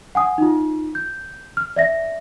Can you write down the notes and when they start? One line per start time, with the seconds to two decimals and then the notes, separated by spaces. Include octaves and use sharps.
0.15 F#5 G#5 D#6
0.38 D#4 F4
0.95 G6
1.57 F6
1.76 D5 E5 A#6